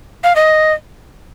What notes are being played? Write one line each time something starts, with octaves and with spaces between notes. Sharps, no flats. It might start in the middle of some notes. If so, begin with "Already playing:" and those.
F5
D#5